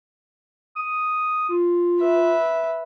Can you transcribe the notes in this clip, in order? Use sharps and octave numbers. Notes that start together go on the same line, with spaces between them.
D#6
F4
B4 E5